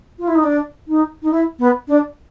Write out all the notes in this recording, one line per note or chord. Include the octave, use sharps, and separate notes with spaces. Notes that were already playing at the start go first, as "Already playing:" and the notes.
F4
E4
D#4
D4
D#4
D#4
E4
B3
D4